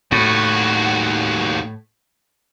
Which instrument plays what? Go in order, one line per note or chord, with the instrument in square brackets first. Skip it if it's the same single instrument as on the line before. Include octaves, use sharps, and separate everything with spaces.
[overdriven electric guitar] D#2 F#4 [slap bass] A2